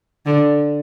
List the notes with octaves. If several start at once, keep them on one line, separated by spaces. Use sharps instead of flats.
D3